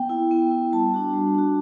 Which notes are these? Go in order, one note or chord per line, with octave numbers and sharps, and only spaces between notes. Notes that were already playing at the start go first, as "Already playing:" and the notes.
Already playing: B3 G5
E4
B3
E4
G3 A5
D4 F#4
G3
D4 F#4